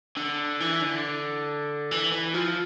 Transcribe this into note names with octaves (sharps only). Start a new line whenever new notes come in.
D3
E3
D3
E3
E3
F3